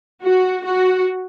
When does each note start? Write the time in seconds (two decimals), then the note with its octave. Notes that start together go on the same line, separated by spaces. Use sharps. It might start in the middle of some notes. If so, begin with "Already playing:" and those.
0.23 F#4
0.64 F#4